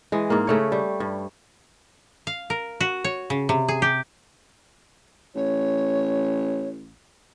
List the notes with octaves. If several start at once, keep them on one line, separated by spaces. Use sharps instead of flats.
E3 G#3
G#2 A#3
C#3 A3 C#5
G3
G2
F5
A#4
F#4
C#5
C#3
C3
G#4
G4
A1 C#5